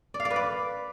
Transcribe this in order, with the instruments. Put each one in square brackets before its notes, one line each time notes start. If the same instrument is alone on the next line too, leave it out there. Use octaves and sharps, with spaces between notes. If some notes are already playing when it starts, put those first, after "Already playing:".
[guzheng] D5
F5
D5
B4
D5